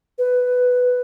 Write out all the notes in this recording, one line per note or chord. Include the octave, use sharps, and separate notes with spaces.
B4